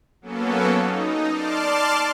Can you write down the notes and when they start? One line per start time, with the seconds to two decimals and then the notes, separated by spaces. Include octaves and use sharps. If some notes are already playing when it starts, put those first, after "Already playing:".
0.21 F#3 A#3 B3 C#4 A4
0.78 D#4
1.29 D5 A5 C6 D6 F6